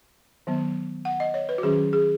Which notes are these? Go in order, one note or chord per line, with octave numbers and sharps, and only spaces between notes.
D#3 F#3 B3
F#5
D#5
C#5
B4
F#4
D#3 F#3 C#4 G#4
G#4